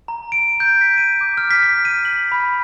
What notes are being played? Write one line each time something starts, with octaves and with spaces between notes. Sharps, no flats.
A#5
D7
G6
B6
D#7
D6
F6
B6
B6
D#7
F#7
B5